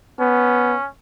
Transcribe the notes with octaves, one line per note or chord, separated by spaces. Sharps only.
B3 C#4